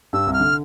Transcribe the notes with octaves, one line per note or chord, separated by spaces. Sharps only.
G2 G3 E6
C2 C3
F6
D3